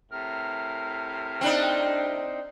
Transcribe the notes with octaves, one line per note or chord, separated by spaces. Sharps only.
A2 C3 A#4
C4 D4 D#4